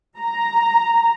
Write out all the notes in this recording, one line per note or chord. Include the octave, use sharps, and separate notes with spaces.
A#5